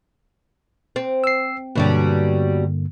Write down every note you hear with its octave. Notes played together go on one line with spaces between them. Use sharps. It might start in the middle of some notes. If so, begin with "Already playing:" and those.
C4
E6 C7
G2 B2 D3 F#3 G3 A#3